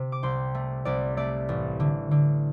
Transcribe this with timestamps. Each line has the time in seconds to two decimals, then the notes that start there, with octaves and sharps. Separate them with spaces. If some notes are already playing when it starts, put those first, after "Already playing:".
Already playing: C3
0.12 D6
0.23 C2 G5 C6
0.55 A3
0.85 C2 D5
1.17 A3 D5
1.49 A1
1.80 D3
2.11 D3